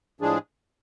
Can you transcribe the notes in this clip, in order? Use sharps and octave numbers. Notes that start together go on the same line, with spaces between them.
A2 F3 G#3 D4 G#4